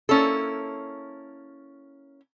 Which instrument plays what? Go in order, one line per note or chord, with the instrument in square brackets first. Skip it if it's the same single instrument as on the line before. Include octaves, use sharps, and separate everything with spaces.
[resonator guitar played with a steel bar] A#3 C#4 E4 A4